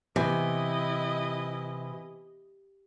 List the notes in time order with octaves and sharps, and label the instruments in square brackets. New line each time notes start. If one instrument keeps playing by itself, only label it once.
[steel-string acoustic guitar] C3 [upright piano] E3 [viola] E4 D#5